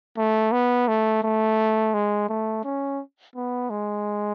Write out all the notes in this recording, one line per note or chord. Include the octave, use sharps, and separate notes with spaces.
A3
B3
A3
A3
G#3
A3
C#4
B3
G#3